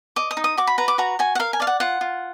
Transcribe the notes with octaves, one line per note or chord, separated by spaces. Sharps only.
D#5 D6
D#6
D#4
D#6
F#4 D6
B5
B4 A#5
D6
F#4 A#5
F#4 G#5
F#5
A#4 F5
G#5
D5 F5
F#5
F4 F#5
F4